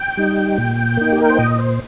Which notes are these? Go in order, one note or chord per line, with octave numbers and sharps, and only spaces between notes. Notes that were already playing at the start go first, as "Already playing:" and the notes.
Already playing: G5
G3 D#4
A#2
A#3 D#4
G4
A#4
C5
A#2 D#5
C5